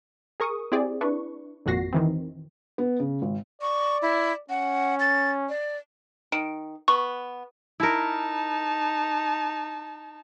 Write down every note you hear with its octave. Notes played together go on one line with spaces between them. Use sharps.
G#4 A#4 C#6 D#6
C4 E4 G4 G#4 D5
D4 E4 B4 C#6
G#1 F2 A#2 F#4 A#6 C7
D#3 E3 C4
B3
C#3
G#1
D5 C#6
E4
C#4 F#5
A6
D5
D#3 D7
B3 C#6
D#4 E4 A#4 A5